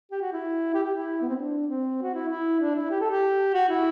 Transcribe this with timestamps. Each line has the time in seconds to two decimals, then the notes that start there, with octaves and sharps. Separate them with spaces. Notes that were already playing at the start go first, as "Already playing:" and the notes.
0.11 G4
0.21 F#4
0.32 E4
0.74 G4
0.84 G4
0.95 E4
1.21 B3
1.29 C4
1.36 D4
1.67 C4
2.02 F#4
2.14 E4
2.29 E4
2.60 D4
2.75 E4
2.91 G4
3.01 A4
3.10 G4
3.54 F#4
3.69 E4